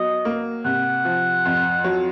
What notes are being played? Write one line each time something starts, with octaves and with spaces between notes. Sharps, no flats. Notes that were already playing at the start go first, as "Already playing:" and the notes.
Already playing: F#3 B3 D#5
A#3
C3 F#5
F3
F2
F#3